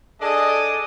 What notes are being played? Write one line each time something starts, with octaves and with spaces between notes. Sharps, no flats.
D4 G#4 A4 D5 D#5